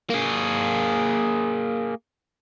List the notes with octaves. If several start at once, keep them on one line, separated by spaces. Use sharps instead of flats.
A#3 G#4